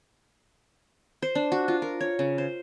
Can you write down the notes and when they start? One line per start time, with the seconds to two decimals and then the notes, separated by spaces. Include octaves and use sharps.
1.22 C5
1.35 D4
1.52 F#4
1.68 F4
1.82 A#4
2.01 C#5
2.19 C#3
2.38 C5